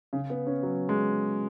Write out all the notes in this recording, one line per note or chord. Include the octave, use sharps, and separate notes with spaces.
C#3
B3
C#4
F#3
G#3